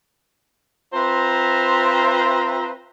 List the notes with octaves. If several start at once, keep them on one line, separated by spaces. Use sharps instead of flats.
C4 F4 B4 C5 E5 A#5